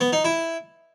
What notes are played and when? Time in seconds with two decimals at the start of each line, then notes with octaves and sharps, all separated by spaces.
0.01 B3
0.13 D#4
0.25 E4